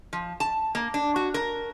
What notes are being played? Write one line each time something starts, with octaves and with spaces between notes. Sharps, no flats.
F3
A5
A#3
D4
F#4
A#4